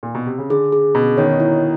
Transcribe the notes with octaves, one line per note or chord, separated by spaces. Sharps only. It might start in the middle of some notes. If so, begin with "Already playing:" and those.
A#2
B2
C3
C#3
D3 G#4
G#4
B2 C#4
D#3 C#5
E4